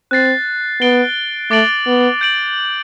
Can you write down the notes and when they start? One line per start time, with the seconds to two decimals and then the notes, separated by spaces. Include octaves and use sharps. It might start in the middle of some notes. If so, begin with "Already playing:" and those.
0.11 C4 F#6 A6 C7
0.81 B3 A6 D7 G7
1.51 A3 D6 A6 D7 F#7
1.87 B3
2.21 G6 D7 F#7